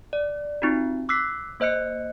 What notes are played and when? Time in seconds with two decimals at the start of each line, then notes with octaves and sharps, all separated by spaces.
0.13 D5
0.62 C4 D#4 F4 F#4
1.09 D6 E6 F#6 B6 C7
1.60 A#3 C5 D#5 F#6 C#7